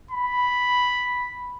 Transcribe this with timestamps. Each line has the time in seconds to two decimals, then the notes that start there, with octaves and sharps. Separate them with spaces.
0.11 B5